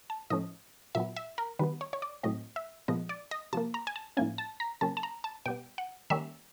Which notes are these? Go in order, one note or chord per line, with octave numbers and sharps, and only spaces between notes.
A5
A2 F3 A3 C#4 D#5
A#2 F#3 B3 E5
E5
A#4
D#3 G3 B3 B4
C#5
C#5
D5
A2 F#3 A3 C4 D#5
E5
A#2 F3 G#3 B3 D#5
D5
D#5
C3 F3 A#3 A5
A#5
G#5
A5
A2 F3 A#3 C#4 G#5
A5
A#5
C#3 F#3 A#3 C#4 A5
A5
A#5
A5
B2 G3 B3 G5
F#5
D#3 G3 A#3 C#4 E5